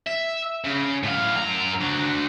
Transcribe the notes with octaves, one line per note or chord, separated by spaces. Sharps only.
E5
C#3
A2 F5
F#2 A#5
D4 F#4